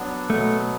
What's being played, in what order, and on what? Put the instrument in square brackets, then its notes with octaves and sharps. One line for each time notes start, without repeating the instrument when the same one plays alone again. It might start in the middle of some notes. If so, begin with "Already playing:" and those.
Already playing: [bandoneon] F#3 B3 D4
[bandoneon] B2 F#3 B3 [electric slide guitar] A3